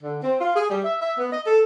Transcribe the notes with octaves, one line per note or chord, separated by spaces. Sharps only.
D3
C4
F4
G#4
G3
E5
E5
B3
D#5
A4